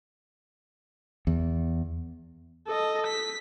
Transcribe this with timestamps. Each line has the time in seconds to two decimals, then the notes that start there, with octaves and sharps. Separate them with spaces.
1.27 E2
2.67 A4 D#5
3.07 B6